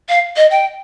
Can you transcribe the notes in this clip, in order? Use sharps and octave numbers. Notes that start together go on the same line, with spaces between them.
F5
D#5
G5